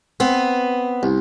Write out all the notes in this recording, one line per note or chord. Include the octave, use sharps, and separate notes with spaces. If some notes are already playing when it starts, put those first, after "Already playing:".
B3 C4
C2